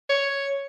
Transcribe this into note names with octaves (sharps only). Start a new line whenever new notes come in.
C#5